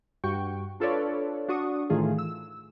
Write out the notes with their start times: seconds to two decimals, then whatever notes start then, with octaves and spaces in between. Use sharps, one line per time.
0.24 G2 F#4 G5 C#6
0.80 D4 F4 A4 B4 C#5 D5
1.49 D4 F#4 C#6 D#6
1.90 A2 D#3 E3 A3 F4 G#4
2.18 E6